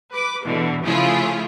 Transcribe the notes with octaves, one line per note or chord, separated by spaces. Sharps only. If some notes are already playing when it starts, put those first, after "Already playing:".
B4 D6
E2 B2 D3 E3
C#3 F3 A3 E4 F4 G#4